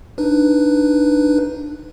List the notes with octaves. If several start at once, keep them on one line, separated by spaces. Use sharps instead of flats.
D4 D#4 B4